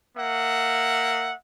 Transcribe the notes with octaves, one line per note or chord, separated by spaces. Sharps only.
A#3 E5 F#5